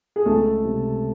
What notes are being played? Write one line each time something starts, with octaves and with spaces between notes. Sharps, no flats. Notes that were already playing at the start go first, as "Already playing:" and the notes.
G#4
C#2 A3 A4
C3